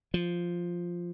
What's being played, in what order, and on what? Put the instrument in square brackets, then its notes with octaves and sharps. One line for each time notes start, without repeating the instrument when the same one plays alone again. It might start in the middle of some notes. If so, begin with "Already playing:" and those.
[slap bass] F3